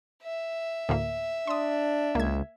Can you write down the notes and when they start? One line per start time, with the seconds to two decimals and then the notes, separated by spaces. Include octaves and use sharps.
0.23 E5
0.89 D2 A2 A#3
1.47 D4 C6 D#6
2.15 C#2 A#3 G#6